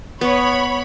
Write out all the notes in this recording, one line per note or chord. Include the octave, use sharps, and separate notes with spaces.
B3 C#5 B5